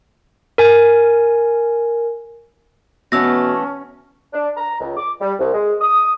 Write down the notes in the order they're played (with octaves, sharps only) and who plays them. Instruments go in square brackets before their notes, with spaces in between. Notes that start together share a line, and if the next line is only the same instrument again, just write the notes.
[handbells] A#4 G#5
[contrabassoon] B2 [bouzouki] E3 A3 B3 [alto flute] C#4 [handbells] E6 A#6
[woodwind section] D4
A#5
C#2
D6
G3
C2
G#3
D#6